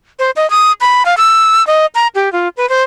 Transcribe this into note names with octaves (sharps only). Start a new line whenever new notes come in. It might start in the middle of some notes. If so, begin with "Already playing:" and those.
C5
D#5
D#6
B5
F5
E6
D#5
A#5
G4
F4
B4
C5